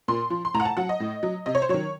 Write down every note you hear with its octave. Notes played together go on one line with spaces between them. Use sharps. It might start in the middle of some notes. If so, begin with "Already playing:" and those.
A#2 C6
F3
C6
A2 A#5
F#5
A5
F#3 F#5
D#5
A2
F#3
C3 D#5
C#5
C5
D#3 F#3 C#5